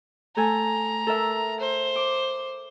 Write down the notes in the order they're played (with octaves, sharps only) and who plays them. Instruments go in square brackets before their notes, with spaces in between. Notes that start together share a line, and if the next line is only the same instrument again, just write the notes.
[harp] A3 A4 G#5 [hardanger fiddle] A#5
[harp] A4 A#4 E5
[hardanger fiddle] C5
[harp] D6